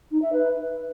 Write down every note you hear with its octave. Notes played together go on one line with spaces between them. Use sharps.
D#4
E5
B4